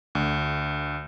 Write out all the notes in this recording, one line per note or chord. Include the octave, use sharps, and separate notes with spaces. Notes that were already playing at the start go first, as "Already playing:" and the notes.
D2